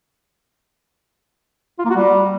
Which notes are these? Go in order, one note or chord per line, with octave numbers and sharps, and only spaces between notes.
F4
A#3
F#4
G3